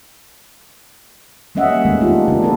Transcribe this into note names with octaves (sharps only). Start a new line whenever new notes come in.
G3 A#3 C#4 D#5 E5 F#5
D#3 G#3 A3 B3
D4 D#4 F4 G4
C#3 E3 A#3 D4
F3 B3 E4 A4 B4